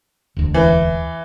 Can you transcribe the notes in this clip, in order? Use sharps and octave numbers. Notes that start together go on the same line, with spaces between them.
E1 D2
E3